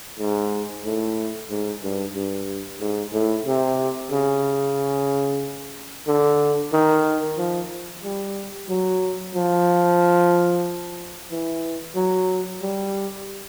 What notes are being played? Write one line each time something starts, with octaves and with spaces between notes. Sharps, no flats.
G#2
A2
G#2
G2
G2
G#2
A2
C3
C#3
D3
D#3
F3
G3
F#3
F3
E3
F#3
G3